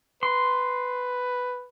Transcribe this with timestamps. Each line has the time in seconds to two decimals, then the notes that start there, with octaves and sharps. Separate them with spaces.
0.23 B4 C6